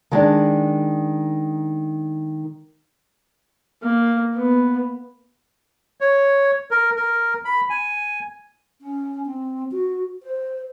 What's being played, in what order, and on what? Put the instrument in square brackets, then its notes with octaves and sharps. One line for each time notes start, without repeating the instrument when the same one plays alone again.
[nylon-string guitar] D#3 G#3 D4
[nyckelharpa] A#3
B3
[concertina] C#5
A#4
A#4
B5
G#5
[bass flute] C#4
C4
F#4
C5